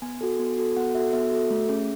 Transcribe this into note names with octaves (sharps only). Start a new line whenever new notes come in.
B3 G#5
F#4 A4
B3
F#4 A4
B3 F#5
F#4 A4 E5
B3 E5
F#4 A4
A3
C#4 G#4